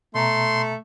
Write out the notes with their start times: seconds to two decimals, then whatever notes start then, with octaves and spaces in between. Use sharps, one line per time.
0.15 B2 A3 E5 A#5 C6